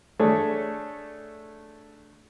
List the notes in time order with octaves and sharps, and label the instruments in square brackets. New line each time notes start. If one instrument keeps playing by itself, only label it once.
[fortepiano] A3 D4 G#4 A4 C#5